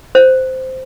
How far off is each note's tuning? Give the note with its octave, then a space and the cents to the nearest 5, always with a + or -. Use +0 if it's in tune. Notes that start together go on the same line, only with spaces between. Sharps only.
C5 -10